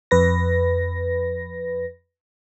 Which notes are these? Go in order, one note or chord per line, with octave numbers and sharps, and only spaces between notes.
F2 B4 A#6